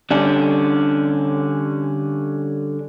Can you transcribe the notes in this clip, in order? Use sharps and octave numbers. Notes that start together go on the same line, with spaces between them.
D3 G3 C#4 D4